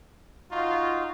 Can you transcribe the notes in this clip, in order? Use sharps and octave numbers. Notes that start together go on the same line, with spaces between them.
D#4 F4 F#4